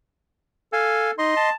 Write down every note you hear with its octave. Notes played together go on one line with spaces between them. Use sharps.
A4 F5 G#5
D#4 D#5 C6
A5